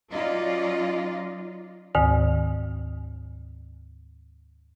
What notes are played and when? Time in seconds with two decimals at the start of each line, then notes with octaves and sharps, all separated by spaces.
0.10 F#3 C#4 D#4 F4 D5 D#5
1.95 D2 G#2 D#3